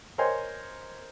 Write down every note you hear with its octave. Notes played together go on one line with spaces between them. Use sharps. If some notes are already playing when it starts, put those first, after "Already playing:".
A#4 C5 C#5 D#5 G#5 C6